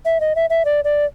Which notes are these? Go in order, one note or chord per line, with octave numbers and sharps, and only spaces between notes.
E5
D#5
E5
E5
D5
D5